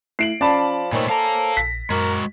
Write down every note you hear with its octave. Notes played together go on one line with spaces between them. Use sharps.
A3 E4 C7 D7 F#7
F3 C#4 D5 A5 B5
A#2 D#3 A3 C5 C#5 G#5
A4 F5 A#5
A#1 A#6 B6
F#2 G#3 F#4 A#4 D6